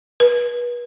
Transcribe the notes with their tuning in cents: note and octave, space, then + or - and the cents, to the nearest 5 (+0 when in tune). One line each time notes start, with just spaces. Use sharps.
B4 -30